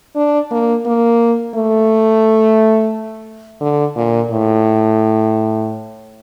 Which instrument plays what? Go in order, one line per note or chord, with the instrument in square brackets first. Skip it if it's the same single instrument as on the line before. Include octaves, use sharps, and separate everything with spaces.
[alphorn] D4
A#3
A#3
A3
D3
A#2
A2